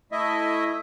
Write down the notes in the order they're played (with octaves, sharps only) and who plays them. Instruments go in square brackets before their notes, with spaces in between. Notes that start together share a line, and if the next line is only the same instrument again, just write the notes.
[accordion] A3 E4 D#5 E5